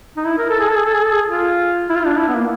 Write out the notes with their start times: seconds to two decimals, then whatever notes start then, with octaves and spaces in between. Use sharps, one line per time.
0.17 D#4
0.26 E4
0.38 A#4
0.49 A4
0.60 G#4
0.68 A4
0.76 G#4
0.85 A4
0.93 G#4
1.03 A4
1.11 G#4
1.28 F4
1.89 E4
1.95 F4
2.05 D4
2.17 E4
2.28 B3
2.35 A#3